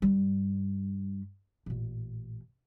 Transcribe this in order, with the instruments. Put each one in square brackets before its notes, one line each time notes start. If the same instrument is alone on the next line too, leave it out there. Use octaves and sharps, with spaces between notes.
[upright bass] G2 G3
A1 A#2